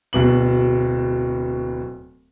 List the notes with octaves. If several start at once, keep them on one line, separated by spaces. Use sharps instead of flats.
D1 B2 F#7